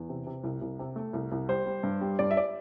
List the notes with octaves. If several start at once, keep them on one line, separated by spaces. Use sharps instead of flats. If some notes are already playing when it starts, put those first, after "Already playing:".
Already playing: E2
C3
C3
C2
C2
C3
A3
C2
C2
G3 C5
G3
G2
G3
G2 D5
E5
D5